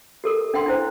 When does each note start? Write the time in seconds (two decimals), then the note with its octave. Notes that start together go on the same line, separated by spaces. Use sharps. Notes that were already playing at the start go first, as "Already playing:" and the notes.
0.24 G4 A4 A#4
0.54 D4 F#5 G5 C6
0.66 D4 E4 C5